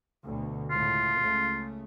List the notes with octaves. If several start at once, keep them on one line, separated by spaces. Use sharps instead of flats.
D2 B2
C#2 A2 F4
C#2 C#3 A3